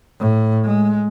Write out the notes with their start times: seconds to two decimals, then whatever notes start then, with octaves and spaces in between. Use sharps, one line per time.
0.19 A2
0.65 G#3